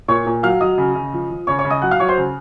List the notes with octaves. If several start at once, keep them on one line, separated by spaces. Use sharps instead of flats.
A#2 C#5 C#6
A#2
F#3 F5 F6
F#3 D#5 D#6
C#3
C#3
F3
F3
C#3 C#5 C#6
C#5 C#6
C#3
D#5 D#6
F#3 F#5 F#6
F5 F6
F#3 C#5 C#6
C5 C6
C#3